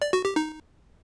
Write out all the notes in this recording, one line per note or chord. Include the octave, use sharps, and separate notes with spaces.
D5
F#4
G4
D#4